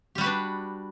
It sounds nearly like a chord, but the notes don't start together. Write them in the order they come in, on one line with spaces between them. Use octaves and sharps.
G4 G3 F#4 B4 D4